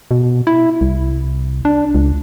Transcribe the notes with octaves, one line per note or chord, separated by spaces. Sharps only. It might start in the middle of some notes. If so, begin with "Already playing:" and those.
B2
E4
C2
D4
C#2